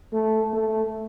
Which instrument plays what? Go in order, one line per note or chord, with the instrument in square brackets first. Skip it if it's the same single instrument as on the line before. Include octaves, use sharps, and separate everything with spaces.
[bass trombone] A3
A3